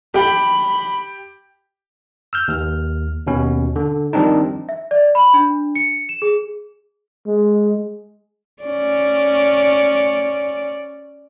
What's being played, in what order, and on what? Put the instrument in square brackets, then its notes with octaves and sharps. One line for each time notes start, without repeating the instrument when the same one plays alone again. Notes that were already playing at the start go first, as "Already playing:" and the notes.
[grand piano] G4 G5 [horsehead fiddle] B5
[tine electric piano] E6 F6 G6
D#2 F6
D#2 B2 C#4
D3
D#3 F3 G3 C4 D4 D#4
[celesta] E5
D5
B5
D4
C#7
E7
G#4
[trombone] G#3
[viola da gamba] C#4 D5